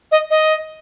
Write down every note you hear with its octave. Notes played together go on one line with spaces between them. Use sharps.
D#5
D#5